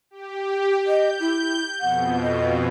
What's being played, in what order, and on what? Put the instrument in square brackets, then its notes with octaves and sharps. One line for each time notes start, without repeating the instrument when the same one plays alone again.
[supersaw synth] G4
[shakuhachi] D#5 [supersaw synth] G6
[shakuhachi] E4
[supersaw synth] F2 B2 [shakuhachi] F#5
[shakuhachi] D#5